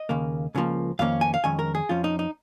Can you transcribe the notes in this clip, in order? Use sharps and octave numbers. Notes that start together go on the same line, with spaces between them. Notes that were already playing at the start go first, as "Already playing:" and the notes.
Already playing: D#5
D#2 C#3 A#3
C#2 C#3 F3 A#3
F2 D#3 A#3 C#4 F5
G#5
F5
F2 D#3 G#3 C#4 G#5
A#4
G#4
F2 F3 C#4 F4
D#4
D#4